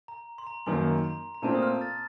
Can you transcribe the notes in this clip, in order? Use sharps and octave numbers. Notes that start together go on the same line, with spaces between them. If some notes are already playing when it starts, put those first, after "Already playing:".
A#5
C6
A#5
F#2 D#3 A#3 C6
A#5
A#5
A#2 A3 C4 F4 A5
D#6
F6
A6